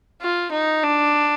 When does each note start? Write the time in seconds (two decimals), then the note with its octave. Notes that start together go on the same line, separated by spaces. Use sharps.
0.21 F4
0.51 D#4
0.83 D4